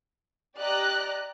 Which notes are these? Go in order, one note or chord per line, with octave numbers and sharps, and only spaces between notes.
G4 D5 D#5 A#5 F#6